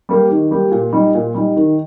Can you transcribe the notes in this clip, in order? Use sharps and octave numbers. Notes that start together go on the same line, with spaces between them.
G3 A#3 G4
D#3
G3 A#3 G4
A#2
G3 D#4
A#2
G3 D#4
D#3